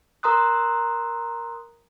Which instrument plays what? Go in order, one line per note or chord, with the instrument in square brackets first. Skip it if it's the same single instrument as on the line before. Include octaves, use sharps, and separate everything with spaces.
[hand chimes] A#4 A#5 C6 D#6 F#6